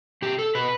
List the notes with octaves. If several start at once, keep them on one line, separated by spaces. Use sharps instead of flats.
B2 G4
A4
B2 B4